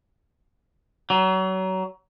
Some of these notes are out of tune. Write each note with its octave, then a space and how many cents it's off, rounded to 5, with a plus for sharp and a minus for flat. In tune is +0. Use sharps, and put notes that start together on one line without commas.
F#3 +30